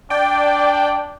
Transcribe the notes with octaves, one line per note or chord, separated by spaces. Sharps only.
D4 D5 G5